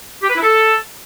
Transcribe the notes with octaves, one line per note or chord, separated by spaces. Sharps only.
G4
B4
E4
A4